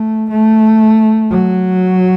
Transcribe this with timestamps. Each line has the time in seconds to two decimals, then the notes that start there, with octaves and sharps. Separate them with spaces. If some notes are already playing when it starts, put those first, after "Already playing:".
Already playing: A3
0.30 A3
1.30 F#3